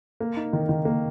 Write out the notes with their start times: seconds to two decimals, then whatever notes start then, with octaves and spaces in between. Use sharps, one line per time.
0.21 A#3
0.37 D#4
0.53 D#3
0.69 D#3
0.85 A#3